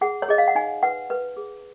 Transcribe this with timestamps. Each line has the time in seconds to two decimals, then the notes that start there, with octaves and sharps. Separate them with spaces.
0.01 G#4 F#5
0.22 C#5
0.28 G#4 D#5
0.38 F5
0.48 F#5
0.55 D#4 G#5
0.83 B4 F#5
1.10 B4
1.37 G#4